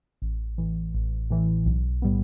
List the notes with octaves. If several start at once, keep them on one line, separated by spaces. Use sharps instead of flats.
A1
A2 E3
A1
A2 E3
B1
A2 G3 B3